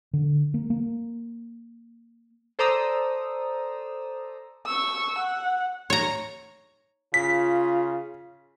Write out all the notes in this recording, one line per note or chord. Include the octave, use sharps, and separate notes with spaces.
D3
A#3
A#3
A4 C5 D5 A#5 D#6 E6
C#6 E6
F#5
C#5 A#5
C#3 F4 B6